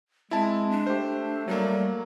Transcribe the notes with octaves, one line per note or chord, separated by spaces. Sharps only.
G#3 C4 E4 A5
D4
A3 G4 C5
F#3 G3 A#3